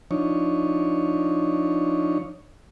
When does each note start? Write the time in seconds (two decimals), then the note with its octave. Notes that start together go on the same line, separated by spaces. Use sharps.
0.11 F3 D4 D#4 C#5